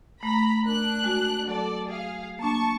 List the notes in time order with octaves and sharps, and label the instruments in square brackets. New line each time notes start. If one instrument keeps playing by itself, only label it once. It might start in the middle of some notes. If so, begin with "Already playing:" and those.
[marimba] A3 [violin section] A#5 B5 B6
[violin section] D4 F#6 [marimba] A#4
[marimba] G#3 F#4
[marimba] F#3 [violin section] A4 D5
[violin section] G#4 F5
[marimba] A#3 D4 [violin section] A5 C#6